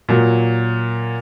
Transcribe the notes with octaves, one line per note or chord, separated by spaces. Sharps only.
A#2 F#3